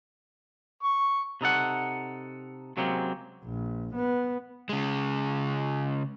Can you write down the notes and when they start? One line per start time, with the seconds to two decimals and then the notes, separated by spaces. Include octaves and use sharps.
0.83 C#6
1.41 C3 D#4 A4 F#5
2.77 C3 F#3 G#3 A#3 C4 C#4
3.44 A#1
3.95 B3
4.69 C#3 G#3